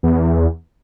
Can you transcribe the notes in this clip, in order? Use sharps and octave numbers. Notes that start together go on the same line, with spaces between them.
E2